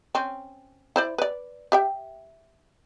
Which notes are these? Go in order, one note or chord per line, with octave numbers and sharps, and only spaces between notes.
C4 C#4
E4 C5 D5
B4 D5
G4 E5 G5